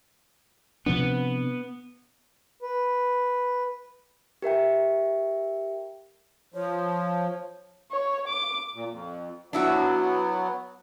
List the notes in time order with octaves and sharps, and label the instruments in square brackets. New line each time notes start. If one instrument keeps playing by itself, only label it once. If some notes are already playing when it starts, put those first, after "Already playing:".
[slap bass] C3 F3 D4 [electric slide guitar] B3
[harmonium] B4
[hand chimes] G4 A#4 E5 G5
[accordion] F3 [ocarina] C#5
[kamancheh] C#5
D6
[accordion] A#2
F2
[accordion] F#3 B3 [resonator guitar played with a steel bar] D4 E4 F#4